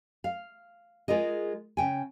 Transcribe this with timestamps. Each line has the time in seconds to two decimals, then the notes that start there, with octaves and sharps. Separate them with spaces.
0.24 F5
1.08 G#3 F4 G#4 A#4 D#5
1.77 C#3 G5 G#5